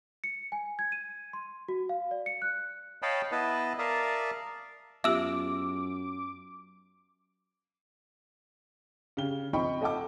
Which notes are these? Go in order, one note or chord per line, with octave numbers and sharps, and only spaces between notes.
C#7
G#5
G#6
D#7
C6
F#4
F5
D5
C#7
F#6
C#5 D#5 F5 G5 A5 B5
B3 E4 B4 D#5 A5
A#4 D5 E5 F5 A5 D#6
F#2 B3 F4 G4 E5 D6 E6
C#3 G4 G7
F3 C4 D#4 G5 B5 C#6
A4 D#5 F#5 G5 A5 D6